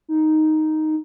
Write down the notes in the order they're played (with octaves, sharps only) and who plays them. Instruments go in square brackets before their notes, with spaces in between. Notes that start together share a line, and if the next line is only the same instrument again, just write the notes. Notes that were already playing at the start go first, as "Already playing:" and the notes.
[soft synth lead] D#4